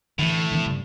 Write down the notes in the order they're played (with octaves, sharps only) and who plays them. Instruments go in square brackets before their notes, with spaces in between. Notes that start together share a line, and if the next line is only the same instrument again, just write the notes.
[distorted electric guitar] A2 [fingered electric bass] D3 E3
[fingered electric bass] D3 E3 B3
G2 C#3 G3